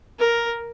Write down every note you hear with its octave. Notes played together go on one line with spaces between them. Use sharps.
A#4